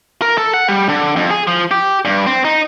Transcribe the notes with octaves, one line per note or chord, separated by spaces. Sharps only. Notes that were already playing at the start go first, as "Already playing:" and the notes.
A#4
A4
F#5
G3
D3
F2
G#4
F3
G4
G2
C4
D#4